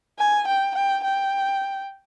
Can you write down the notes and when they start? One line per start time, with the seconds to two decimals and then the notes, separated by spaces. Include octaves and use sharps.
0.19 G#5
0.48 G5
0.76 G5
1.04 G5